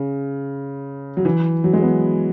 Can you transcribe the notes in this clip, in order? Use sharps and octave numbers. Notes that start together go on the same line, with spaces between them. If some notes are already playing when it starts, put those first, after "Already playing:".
Already playing: C#3
F#3
E3
F#3
G#3
B3